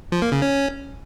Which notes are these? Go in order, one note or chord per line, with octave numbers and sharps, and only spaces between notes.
F3
A#3
C#3
C#4